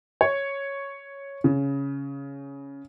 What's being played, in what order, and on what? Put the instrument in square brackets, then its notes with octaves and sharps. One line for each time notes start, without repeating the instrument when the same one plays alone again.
[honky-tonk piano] C#5
C#3